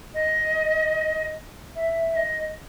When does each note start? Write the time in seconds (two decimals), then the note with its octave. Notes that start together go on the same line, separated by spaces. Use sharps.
0.14 D#5
1.75 E5
2.09 E5
2.16 D#5